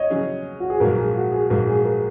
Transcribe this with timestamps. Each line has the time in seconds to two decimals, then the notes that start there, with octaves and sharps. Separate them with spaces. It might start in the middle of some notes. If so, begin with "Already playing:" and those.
Already playing: C#5 D#5
0.10 C#3 F#3 C#4 G#4
0.60 F#4
0.70 G#4
0.80 A#1 G#2 F#3 A#4
0.97 G#4
1.16 F#4
1.32 G#4
1.50 A#1 G#2 F#3 A#4
1.67 G#4
1.85 A#4